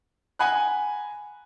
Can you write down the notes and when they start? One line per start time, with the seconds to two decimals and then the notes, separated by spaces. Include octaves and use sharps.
0.39 F#5 G#5 A#5 B5 F#6